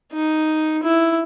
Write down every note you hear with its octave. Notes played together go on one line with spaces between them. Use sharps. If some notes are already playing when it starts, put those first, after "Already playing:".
D#4
E4